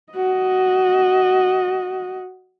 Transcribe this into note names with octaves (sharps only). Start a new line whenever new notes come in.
F#4 D#5